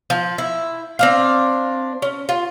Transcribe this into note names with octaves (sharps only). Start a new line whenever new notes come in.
F3
E4
C4 D4 F5
C#4
F4